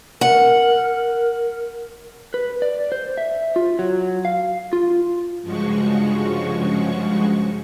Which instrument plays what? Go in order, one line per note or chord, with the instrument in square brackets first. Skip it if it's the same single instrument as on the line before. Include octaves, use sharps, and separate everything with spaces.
[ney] A#4 [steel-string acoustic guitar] F#5
[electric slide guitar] B4
D5
C5
E5
F4
F#3
F5
F4
[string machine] G2 C#3 F3 G#3 F#4 C#6